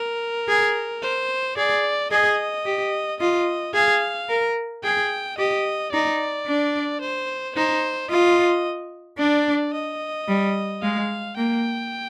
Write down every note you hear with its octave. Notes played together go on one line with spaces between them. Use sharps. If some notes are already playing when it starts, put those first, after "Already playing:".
Already playing: A#4
G#4
C5
G#4 D5
G#4 D#5
G4
F4 D#5
G#4 F5
A#4
G#4 G5
G4 D#5
D#4 D5
D4
C5
D#4 C5
F4 D#5
D4 D5
D#5
G3
G#3 F5
A#3 G5